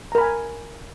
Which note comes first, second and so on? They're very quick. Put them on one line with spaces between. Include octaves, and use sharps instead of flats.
A#5 A#4 B5 G#5